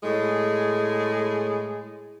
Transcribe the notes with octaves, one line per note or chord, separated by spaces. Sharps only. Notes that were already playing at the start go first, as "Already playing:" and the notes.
A2 G#3 G#4